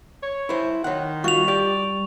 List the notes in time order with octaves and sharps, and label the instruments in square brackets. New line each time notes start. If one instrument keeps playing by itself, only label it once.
[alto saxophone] C#5
[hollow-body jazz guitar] E4 C5
[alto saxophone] D#3 [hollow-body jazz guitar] C#5 F#5 [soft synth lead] C6
[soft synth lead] G3 [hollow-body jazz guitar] F4 F#4 [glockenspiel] C#6 F7
[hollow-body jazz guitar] G4 [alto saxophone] D5